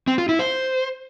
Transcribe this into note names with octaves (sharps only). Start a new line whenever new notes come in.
C4
F4
E4
C5